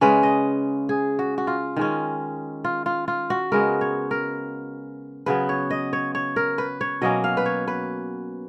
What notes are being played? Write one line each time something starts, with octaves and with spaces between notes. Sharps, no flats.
C#3 G#3 C#4 B4
D#5
G#4
F#4
F#4
F4
D#3 G#3 C#4
F4
F4
F4
F#4
C#3 G#3 B3 A#4
C#5
A#4
C#3 F#3 B3 B4
C#5
D#5
C#5
C#5
A#4
B4
C#5
B2 F#3 A#3 C#4 D#5
F5
B4
C#5
B4